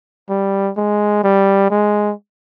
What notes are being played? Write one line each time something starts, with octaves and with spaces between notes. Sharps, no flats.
G3
G#3
G3
G#3